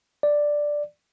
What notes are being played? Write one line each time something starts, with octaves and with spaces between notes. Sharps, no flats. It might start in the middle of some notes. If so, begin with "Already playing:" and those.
D5